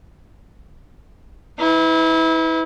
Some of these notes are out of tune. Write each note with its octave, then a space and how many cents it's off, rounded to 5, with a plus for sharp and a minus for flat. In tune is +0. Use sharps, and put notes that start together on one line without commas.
E4 -30 B4 +25